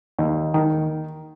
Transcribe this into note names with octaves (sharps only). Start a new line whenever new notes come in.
D#2
D#3